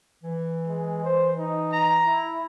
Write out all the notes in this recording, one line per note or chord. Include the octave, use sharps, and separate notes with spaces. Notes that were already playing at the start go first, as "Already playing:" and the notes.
E3
G#3
C5
D#4
A#5
E4